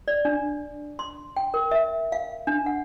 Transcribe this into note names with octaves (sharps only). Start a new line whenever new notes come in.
D5
D4
C6
G5
A#4
E5
F5
D4
F#5